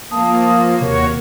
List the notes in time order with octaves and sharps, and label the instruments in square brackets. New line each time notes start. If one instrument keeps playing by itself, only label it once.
[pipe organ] F3 [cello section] A#3 [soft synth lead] A5 [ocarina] D#6
[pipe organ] D#2 F#4 C#5 [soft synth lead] C3 [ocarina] A#4